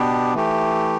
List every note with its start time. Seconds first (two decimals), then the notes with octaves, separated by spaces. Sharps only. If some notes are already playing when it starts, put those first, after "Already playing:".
Already playing: B2 B3 D4 G4
0.34 E3 A3 G4